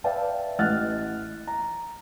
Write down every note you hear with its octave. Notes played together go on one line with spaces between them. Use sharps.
B4 D5 E5 F5 G5 A5
A1 D#5 F#5 F6 F#6 A6
A#5